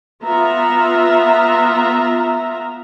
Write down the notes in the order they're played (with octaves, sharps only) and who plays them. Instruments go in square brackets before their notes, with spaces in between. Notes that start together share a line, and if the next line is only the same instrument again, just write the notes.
[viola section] B3 F4 E5 A#5